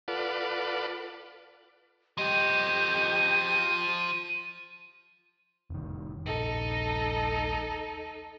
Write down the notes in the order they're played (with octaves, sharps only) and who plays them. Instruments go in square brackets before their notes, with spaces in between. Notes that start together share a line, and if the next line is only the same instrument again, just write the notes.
[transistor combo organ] F4 A4 B4 D5 F#5
[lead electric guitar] F3 D#5 [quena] G4 [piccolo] D#7
[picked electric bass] F1 D#3
[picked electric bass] D#1 A#1 [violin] D#4 A4